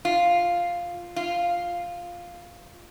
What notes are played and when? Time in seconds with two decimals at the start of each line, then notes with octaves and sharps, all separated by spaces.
0.05 F4
1.16 F4